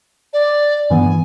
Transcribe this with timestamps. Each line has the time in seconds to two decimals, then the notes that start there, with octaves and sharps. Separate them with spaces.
0.33 D5
0.90 G2 E3 B3 G#5